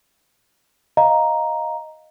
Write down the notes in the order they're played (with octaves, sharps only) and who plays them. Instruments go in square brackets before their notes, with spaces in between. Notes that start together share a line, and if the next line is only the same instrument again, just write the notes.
[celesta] D#5 F5 A#5